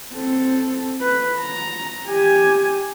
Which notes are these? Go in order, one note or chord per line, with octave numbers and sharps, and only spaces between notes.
C4 A4
B4
A#5
G4 G#5